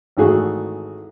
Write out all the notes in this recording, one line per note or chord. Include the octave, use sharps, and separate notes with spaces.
G#1 E3 A3 F#4 G#4